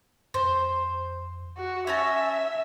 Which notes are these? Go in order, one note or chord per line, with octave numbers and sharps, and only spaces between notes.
F2 C5
F#4
C#4 E5 G#5 A5 G#6 A#6